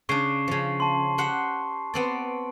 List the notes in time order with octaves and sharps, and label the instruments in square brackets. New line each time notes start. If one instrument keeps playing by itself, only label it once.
[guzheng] C#3 D4 [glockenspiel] C#6 C7
[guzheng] C#3 F3
[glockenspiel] A5 C6
[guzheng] G4 C5 F#5
B3 C4 D5